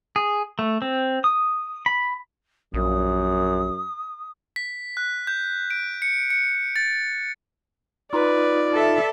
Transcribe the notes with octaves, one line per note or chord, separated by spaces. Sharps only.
G#4
A3
C4
D#6
B5
A#1 F#2 D#6
B6
F#6
G6
D7
C#7
C#7
A6
D#4 F4 B4 D5
A4 E5